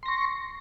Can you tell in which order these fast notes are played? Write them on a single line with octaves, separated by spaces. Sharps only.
C6 A#6 C#6